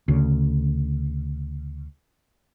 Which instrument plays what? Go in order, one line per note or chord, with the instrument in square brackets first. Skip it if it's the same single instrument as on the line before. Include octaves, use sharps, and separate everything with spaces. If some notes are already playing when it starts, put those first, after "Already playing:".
[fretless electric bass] D2 C#3